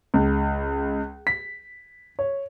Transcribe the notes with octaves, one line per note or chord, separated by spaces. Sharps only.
C#2
B6
C#5